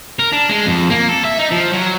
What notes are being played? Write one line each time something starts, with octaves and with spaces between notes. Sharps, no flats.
A#4
D4
G#3
F2
A#3
A4
E5
D#4
F3
F#3